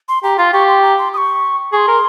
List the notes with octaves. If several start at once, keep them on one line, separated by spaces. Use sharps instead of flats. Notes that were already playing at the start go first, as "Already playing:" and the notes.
C6
G4 A#5
F4 C6
G4 C#6
C6
A#5
C6
D#6
C#6
G#4 C6 C#6
A#4